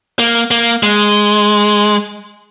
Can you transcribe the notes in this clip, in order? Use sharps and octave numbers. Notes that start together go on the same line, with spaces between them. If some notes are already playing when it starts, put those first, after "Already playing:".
A#3
A#3
G#3